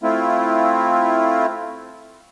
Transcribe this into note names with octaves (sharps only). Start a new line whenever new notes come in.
A3 C4 E4 F4